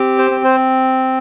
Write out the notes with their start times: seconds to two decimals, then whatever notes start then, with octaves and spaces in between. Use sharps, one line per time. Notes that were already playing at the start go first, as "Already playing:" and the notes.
Already playing: C4 G4
0.18 C5
0.31 C4
0.44 C5